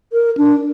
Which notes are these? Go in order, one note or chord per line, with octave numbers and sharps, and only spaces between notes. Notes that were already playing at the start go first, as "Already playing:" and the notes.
A#4
D4